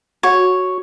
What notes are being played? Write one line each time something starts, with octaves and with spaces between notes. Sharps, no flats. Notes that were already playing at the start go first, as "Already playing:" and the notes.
F#4 C#5